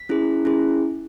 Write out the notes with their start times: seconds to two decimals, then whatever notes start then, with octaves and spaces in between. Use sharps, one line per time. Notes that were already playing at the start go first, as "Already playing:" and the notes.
Already playing: B6
0.09 C#4 E4 G#4
0.45 C#4 E4 G#4